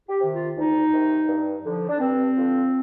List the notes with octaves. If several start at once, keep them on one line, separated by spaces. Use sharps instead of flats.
G4
C3 D#3
F4
D2 D#4
C3 D#3
G2
D3 F3
D4
G2 C4
D3 F3